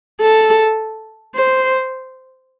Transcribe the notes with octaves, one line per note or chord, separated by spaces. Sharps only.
A4
C5